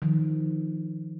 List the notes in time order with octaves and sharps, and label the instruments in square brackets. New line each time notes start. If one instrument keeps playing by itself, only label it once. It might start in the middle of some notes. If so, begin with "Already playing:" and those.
[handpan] D#3 F3